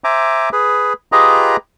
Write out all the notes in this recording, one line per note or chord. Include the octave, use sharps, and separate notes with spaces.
C5 E5 G#5 A#5 D6
G#4 B4
F4 G4 G#4 B4 D#5 A#5